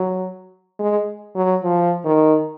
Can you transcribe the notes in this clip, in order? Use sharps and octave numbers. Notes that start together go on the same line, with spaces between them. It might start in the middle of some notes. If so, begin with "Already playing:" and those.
Already playing: F#3
G#3
F#3
F3
D#3